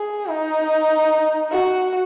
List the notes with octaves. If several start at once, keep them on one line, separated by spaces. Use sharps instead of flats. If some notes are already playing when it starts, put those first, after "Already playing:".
Already playing: G#4
D#4
F#4